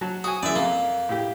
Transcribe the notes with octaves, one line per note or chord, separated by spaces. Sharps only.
F#3 F#4 A5
F#4 G#5 D#6
F#2 E3 G#3 D5 E5
F2 A#3
A2 G4